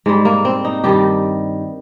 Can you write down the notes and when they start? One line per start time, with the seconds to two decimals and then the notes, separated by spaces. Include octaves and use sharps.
0.06 G#2 G3 G#3
0.25 A#3
0.45 C4
0.65 D#4
0.84 G2 D#3 G3 G4